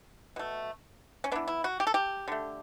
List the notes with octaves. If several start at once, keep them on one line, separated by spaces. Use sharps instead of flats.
B2 A3
C#4
E3 B3 D4
E4
F#4
G4
A4
G4
D3 A3